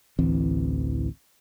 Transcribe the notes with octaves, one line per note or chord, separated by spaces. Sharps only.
A1 D2 E3 C4